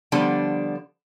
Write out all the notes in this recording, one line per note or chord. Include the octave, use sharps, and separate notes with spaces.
D3 F3 G3 B3 D4